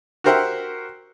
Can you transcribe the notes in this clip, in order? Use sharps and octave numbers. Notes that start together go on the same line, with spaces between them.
F#4 G4 A#4 C5 E5 F#5